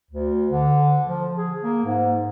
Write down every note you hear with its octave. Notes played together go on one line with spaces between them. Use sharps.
D2
D3
F3
G#4
A#3
G#2